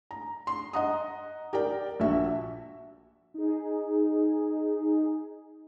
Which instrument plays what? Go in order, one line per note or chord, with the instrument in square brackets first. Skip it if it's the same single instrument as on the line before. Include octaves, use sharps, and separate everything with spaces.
[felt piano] A#5
C6
D#5 F#5 A#5 D#6
G4 A#4 D5 G5
A#1 F#4 E5
[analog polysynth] D#4 G#4